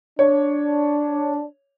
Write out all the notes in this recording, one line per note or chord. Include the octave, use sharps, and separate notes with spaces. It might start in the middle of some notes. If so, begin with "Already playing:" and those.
D4 C#5